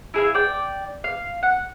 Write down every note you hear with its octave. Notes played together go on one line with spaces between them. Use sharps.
E4 G#4 E5 F5
D5 G5
F5
F#5